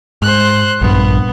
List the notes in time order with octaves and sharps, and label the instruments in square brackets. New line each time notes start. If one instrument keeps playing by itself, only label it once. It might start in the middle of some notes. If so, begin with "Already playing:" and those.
[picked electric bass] G#2 [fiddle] C5 F#6
[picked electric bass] A#1 G2 [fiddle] B3